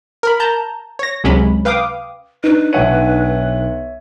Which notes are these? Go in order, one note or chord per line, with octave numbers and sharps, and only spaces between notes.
A#4 B5
A5 A#5 G6
C#5 A#6
C#2 C3 F#3 G#3 C#4 B5
B4 F5 G5 D6 D#6
D4 D#4 B4
B1 C#5 E5 F#5 D#7